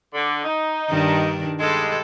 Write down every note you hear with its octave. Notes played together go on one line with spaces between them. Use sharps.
D3
D#4
G2 D#3 D4
G2 G#3 A4